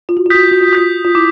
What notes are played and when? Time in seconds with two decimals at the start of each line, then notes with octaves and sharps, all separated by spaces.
0.09 F4
0.17 F#4
0.26 F4
0.30 F#4 D#6 G6 B6
0.43 F4
0.51 F#4
0.61 F4
0.69 F#4
0.73 F4 D#6 G6 B6
1.05 F4
1.15 E4 D6